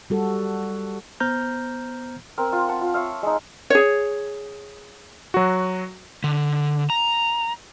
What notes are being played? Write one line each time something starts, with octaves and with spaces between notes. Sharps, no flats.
G3 F#4 A4
B3 C5 A#5 F6 G6
C4 A#4
F4
F#5 A5
F4
C#5 E5 F5
G#3 D#4
G#4 C#5
F#3 F#4
D3
A#5